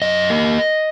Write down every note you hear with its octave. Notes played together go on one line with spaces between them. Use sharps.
F#2 D#5
A#3